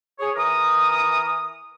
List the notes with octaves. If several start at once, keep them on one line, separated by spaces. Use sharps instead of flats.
G#4 C#5
E3 A#4 A#5 D#6